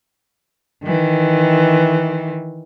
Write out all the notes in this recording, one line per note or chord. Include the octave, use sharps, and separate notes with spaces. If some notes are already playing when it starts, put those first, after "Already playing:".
D#3 E3